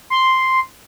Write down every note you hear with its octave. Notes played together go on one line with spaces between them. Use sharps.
C6